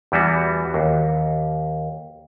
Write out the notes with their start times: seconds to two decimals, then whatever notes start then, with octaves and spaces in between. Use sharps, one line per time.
0.12 E2 E3 G3 B3 F#4
0.74 D#2